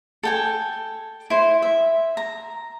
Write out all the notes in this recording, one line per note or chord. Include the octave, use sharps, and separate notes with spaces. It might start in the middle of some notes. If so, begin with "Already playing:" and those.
A4 G5 G#5
E4 C5
E5
A#5